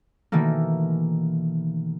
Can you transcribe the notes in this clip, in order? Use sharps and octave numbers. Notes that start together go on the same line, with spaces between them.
B2 D#3 E3 A3 A#3